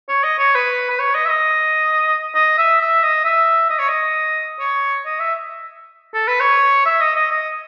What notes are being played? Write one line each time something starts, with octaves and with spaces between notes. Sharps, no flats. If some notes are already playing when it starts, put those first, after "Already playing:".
C#5
D#5
C#5
B4
B4
C#5
D#5
E5
D#5
D#5
E5
E5
D#5
E5
D#5
C#5
D#5
C#5
D#5
E5
A4
B4
C#5
E5
D#5
D#5
D#5